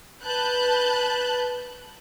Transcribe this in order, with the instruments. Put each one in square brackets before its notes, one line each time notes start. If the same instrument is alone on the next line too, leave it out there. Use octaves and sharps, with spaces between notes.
[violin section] B4 A5 F#6 G6